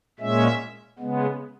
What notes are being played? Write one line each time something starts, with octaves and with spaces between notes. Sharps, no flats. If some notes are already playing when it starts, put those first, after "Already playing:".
A#2 G#3 C#4 E5
C#3 G#3 B3